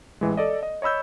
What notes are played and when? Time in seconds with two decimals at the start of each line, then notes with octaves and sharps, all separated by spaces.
0.21 A1 E3 G#3
0.37 A4 D5 D#5
0.63 D#5
0.82 C#5 D#5 B5 E6 G6